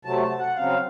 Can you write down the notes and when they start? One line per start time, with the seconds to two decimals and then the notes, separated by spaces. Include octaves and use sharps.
0.05 C3 F#3 A3 A5
0.22 A5
0.40 F#5
0.56 C#3 F#3 C4 F5